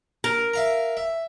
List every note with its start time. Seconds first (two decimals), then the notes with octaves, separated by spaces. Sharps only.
0.24 A#4
0.54 E5 F5 A#5
0.97 E5